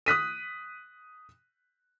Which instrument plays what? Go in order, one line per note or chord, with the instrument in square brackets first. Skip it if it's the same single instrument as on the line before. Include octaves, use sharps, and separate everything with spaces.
[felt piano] D#6 F#6 B6 D#7